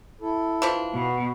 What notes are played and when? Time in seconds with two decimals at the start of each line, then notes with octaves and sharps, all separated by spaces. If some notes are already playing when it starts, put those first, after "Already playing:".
0.21 E4 A4
0.62 E3 F3 D4
0.94 B2 B3